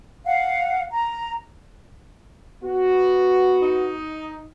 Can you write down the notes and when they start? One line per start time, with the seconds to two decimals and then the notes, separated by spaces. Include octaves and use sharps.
0.24 F5 F#5
0.91 A#5
2.63 B3 F#4
3.63 D#4